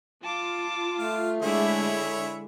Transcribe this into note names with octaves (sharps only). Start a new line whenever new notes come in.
F4 A5 D6
A3 F5
D3 G#3 E4 G#4 C#5 E5 B5